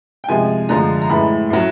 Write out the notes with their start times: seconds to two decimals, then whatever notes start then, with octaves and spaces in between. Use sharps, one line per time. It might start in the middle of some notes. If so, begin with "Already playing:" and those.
0.24 G5
0.29 C3 F3 G#3 G#5
0.69 D3 F3 G#3 A#5
1.02 A#5
1.10 A2 E3 G#3 B5
1.50 A2 F#3